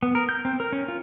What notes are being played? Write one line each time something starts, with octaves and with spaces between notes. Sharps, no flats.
B3
A#4
G6
C4
A#4
C#4
F4